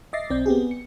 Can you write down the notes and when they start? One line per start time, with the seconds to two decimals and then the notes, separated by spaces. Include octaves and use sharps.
0.13 D#5 E5 D6 A6 A#6 C7
0.30 B1 C4 D5 G6
0.46 B3 C4 G4 G#4
0.58 B3
0.71 C#7